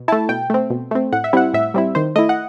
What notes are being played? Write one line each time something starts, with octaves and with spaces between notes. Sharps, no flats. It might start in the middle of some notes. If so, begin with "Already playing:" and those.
Already playing: B2
A3 E4 A5
B2 G5
A3 C4
B2
A3 C4
A2 F#5
E5
G3 C4 E4 F#5
A2 E5
G3 C4 E4
D#3 C5
A3 E4 D#5
F#5